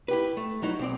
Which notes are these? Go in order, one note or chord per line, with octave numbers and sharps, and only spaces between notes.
E4 G4 B4
A3
F#3 D#4 E4
B1 C4 D5